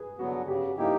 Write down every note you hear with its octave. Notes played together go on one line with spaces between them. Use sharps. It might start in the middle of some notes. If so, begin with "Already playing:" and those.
Already playing: G#4 B4
D3 F#3 B3 F#4
C#3 G4
F3 A#3 D#4 E4 G4